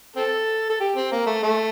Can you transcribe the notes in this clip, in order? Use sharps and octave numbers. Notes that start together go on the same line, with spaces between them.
C4 A4
A4
G4
C4
A#3
A3
A3